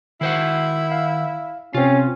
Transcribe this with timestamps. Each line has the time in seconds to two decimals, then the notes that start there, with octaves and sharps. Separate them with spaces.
0.21 D#3 E4 C5 F#5
0.92 F5
1.74 C3 C4 C#4 F4